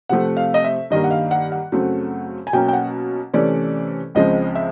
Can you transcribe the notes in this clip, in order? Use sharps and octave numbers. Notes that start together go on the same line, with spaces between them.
C3 F3 A3 C4 F#5
F5
D#5
E5
G2 D#3 G3 A#3 D#5
F#5
F5
F#5
F#5
F#2 C#3 F#3 A3 C4
G#5
B2 F#3 A#3 C#4 G5
G5
F#5
C3 E3 A3 C#4 D5
C#2 C#3 F3 G#3 C4 D#5
E5